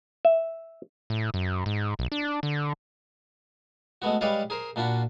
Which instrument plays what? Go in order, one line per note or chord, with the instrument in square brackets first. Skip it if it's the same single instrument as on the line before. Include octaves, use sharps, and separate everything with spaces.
[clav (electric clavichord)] E5
[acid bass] A2
F#2
G#2
B1
D4
D3
[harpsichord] G#3 A3 B3 F#4
G3 G#3 B4 C#5 D5 F5
G#4 A#4 C5
A#2 D4 F4 F#4 B5